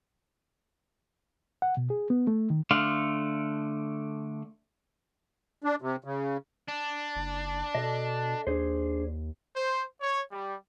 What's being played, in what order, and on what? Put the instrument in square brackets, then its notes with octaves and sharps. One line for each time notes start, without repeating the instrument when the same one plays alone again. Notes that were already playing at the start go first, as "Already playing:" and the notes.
[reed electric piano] F#5
B2
G#4
B3
A3
D#3
[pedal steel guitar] D3 A3 D4 F5 C6
[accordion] D4
C3
C#3
[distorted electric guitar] D4
[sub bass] F#1
[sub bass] B2 [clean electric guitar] A4 D#5
[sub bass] D#2 [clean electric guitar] D4 G#4 C5
[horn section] C5
C#5
G3